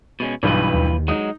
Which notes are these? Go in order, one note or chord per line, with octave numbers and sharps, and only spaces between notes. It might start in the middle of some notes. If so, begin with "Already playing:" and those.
B2 G#3 C#4
B1 G2 E3 F4 B4
D#2
F#3 G#3 D#4 D#6